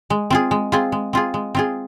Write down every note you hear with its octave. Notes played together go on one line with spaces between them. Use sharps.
G#3
C4 F4 G#4
G#3
C4 F4 G#4
G#3
C4 F4 G#4
G#3
C4 F4 G#4